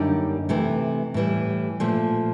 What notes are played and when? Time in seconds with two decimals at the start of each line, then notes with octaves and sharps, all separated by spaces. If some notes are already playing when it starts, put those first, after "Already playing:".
Already playing: F#2 D3 G3 A#3 D#4
0.49 C3 E3 A3
1.14 A2 E3 G3
1.80 A#2 F3 A3